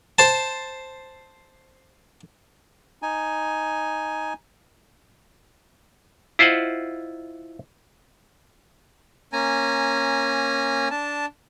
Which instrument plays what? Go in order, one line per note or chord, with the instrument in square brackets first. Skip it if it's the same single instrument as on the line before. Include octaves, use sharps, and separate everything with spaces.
[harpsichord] C5 A5
[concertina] D#4 G#5
[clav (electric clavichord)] E4 F4 C5 D#5 F#5
[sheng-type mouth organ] A#3 C#4 G#5 A#5
D4 A5